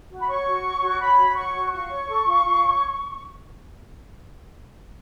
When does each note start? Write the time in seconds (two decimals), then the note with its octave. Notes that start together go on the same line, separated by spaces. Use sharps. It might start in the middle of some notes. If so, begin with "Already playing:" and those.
0.11 F#4
0.20 B5
0.28 C#5 C#6
0.47 F#4
0.64 C#5
0.82 F#4
0.99 C#5 B5
1.18 F#4
1.35 C#5 C#6
1.54 F#4
1.72 F4 C#6
1.90 C#5
2.08 A4
2.26 F4
2.44 F4
2.61 C#5